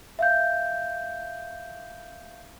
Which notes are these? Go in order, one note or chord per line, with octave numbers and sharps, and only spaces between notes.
E5 F5 G6